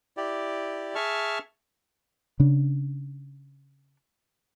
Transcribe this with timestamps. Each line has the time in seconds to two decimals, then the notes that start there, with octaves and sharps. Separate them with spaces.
0.17 E4 G4 D5
0.95 G#4 E5 A5 C#6 F6
2.40 C#3 D4